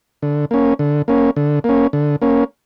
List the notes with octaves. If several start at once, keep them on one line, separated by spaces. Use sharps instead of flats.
D3
A#3 C#4
D3
A#3 C#4
D3
A#3 C#4
D3
A#3 C#4